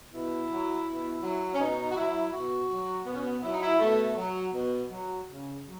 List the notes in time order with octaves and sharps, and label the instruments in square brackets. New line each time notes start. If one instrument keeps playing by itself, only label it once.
[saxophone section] B2 E4
F#3
B2
F#3
C#4
B2 D#4
F#4
F#3 E4
B2 F#4
F#3
B2 B3
C#4
B3
F#3 E4
D#4
E4
B2 A3
F#3
B2
F#3
C#3
F#3